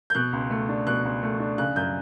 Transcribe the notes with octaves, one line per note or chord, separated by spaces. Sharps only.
G6
B2 F#6
C#2
A3
D4
B2 F#6
C#2
A3
D4
C#3 F#6
F#2 G6